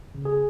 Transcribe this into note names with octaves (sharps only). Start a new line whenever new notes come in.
C#3
G#4